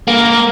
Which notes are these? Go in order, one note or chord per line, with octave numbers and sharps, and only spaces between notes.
A#3